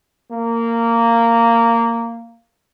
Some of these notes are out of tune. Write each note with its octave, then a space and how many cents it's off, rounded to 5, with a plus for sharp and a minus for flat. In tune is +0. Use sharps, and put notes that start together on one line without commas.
A#3 -15